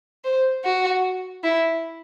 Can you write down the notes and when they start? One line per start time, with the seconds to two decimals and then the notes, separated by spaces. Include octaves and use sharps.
0.24 C5
0.64 F#4
1.43 E4